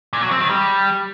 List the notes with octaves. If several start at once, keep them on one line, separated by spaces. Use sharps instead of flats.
A#2
F#3
C4
D#3
G3